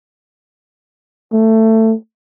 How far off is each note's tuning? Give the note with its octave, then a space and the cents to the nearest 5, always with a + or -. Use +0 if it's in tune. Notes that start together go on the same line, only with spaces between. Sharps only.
A3 +15